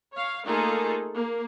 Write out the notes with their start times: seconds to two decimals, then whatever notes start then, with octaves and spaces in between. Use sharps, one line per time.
0.14 C#5 F5
0.45 A3 A#3 D#4 F4 G#4 A4
1.16 A#3